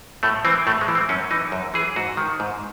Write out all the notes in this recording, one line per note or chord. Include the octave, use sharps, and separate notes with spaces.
A2 A3
E3 C4
A2 A3
G#3
E3
C4
F#2 C#4
E3 D#4
F#2
E3 G#4
G#2 F#4
D#3
G#2